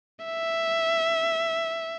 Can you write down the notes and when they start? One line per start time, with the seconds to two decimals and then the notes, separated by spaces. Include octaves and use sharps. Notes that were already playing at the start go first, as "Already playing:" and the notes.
0.25 E5